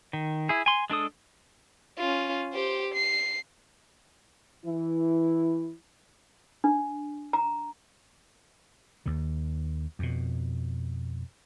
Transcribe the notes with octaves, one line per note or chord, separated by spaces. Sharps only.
D#3
E4 G#4
G#5 C6
G#3 D4 A4 D#6
C#4 F4
G4 C5
C7
E3 E4
D4
A#5
D#2 D#3
F2 B2